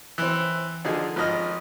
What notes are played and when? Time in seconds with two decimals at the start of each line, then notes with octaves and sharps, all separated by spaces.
0.18 E3 C4
0.84 D3 F3 D#4 G#4
1.16 G#1 F3 D#5 F6